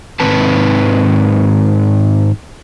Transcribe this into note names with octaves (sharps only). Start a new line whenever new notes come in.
G#2 D#3 C4 B4 A5